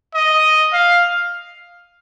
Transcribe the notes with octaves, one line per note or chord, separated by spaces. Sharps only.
D#5
F5